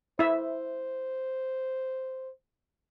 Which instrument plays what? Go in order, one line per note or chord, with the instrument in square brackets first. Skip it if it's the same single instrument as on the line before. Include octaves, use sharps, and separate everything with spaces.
[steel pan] E4 E5 [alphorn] C5